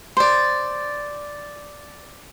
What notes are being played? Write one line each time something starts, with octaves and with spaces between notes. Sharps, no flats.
C5 D5